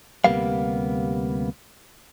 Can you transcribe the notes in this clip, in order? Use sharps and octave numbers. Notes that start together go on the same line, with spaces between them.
D2 C3 G3 A#3 B3 F5